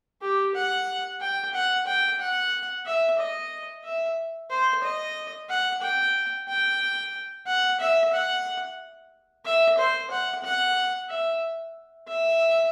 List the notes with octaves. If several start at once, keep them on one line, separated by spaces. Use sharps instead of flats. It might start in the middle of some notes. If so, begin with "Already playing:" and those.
G4
F#5
G5
F#5
G5
F#5
E5
D#5
E5
C5
D#5
F#5
G5
G5
F#5
E5
F#5
E5
C5
F#5
F#5
E5
E5